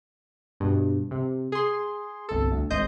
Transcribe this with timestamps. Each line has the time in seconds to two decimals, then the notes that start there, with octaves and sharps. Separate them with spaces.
0.60 G2 B2
1.11 C3
1.52 G#4 C6
2.29 G1 C2 A4
2.52 D2
2.70 G#1 C5 D#5 G6